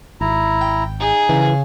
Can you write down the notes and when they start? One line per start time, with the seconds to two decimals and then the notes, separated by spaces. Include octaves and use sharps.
0.21 G#1 E4 A#5
0.61 G5
1.00 D#4 G#4
1.29 C#3 E3